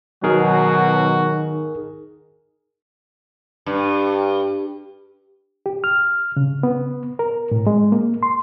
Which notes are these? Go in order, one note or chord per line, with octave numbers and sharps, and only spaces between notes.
B2 D#3 F#3 D#4 F#4 G#4 A#4
G2
G4
F6
C#3
B3
A#4
A2
G#3
A#3
C6